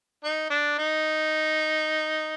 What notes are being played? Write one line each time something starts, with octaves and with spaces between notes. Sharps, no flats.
D#4
D4
D#4